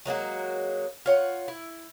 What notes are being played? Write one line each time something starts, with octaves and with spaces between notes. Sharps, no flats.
F#3 G#3 A#3 F#4
F4 C#5 F#5
E4